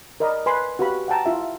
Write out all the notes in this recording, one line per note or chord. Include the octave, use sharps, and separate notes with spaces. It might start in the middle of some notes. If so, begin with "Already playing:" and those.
A#4 D5 D#5 B5
B4 G#5 B5 C6
F#4 G4 B4 F5 B5
F#5 G5 A5 A#5
E4 F4 E5